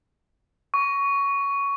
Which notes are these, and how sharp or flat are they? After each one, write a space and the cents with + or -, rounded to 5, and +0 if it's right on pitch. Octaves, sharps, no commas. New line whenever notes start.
C#6 +15